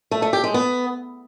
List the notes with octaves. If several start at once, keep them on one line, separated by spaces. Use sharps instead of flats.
A3
A3
G4
G#3
B3